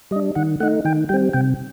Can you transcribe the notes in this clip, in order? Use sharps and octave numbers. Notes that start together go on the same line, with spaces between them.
G3 D4 D#5
D#3 F#5
A3 D#4 F#5
D#3 G5
G3 C4 G5
C3 G5